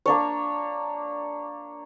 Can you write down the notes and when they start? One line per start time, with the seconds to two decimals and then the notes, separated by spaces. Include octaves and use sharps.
0.06 A#3 D4 C#5